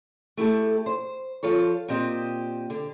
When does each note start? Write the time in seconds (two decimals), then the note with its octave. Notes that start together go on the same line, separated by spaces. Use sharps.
0.37 A3 E4 G4 A4
0.86 C5
1.43 F3 F4 A4 C#5
1.88 A#2 C4 G4 D#5
2.70 D3